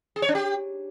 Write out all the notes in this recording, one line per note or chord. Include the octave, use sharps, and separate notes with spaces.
G#4
C#5
D4
G4